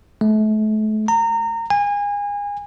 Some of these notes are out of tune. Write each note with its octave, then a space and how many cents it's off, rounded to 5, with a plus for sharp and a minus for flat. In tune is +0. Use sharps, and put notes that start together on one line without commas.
A3 -35
A#5 -25
G#5 -30